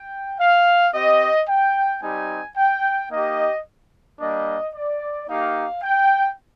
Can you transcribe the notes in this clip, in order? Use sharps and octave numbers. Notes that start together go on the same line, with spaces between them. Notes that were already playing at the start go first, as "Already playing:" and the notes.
Already playing: G5
F5
C4 G4 D#5
G5
G3 C4 D#4 G4 G#5
G5
A#3 D#4 G4 D#5
G3 A#3 D4 D#5
D5
A#3 D#4 G4 F5
G5